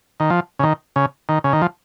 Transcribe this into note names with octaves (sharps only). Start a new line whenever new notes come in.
D#3
F3
C#3
D#3
C#3
D#3
C#3
D#3
F3